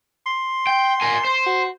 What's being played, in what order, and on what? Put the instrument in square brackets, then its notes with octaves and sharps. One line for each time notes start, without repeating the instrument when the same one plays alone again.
[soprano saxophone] C6
[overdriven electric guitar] G5
A#4 G#5
C5
[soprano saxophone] F#4